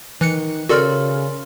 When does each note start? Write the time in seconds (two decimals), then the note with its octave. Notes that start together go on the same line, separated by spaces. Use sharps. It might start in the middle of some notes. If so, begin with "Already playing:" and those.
0.21 D#3 E3 F#6 C#7
0.69 C#3 F#4 A4 A#4 D5 C6 F6